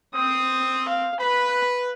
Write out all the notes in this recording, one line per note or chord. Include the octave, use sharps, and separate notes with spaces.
C4 D#6
F5
B4 B5